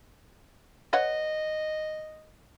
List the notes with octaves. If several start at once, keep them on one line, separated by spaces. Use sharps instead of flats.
B4 C#5 D#5 F#5